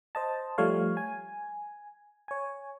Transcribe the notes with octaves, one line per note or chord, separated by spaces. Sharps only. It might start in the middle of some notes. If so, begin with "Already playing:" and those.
C5 D#5 A5
F3 G3 A3 C#5 F5
G#5
C#5 G#5